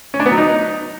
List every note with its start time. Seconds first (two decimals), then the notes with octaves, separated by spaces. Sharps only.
0.14 C#4
0.20 D4
0.26 B3
0.32 F#3
0.38 D#4